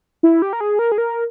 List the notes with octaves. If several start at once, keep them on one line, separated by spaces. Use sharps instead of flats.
E4
G4
A#4
G#4
A#4
G#4
A#4